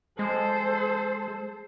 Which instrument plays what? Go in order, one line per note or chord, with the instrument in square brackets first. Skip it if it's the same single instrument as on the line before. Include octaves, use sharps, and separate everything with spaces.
[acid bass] G#3 [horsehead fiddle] A4 C5